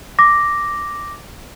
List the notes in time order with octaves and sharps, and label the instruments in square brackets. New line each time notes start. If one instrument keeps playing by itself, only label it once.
[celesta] D6 A#6